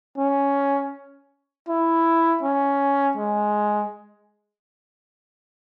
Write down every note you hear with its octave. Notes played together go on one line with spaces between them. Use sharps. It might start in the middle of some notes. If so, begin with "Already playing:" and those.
C#4
E4
C#4
G#3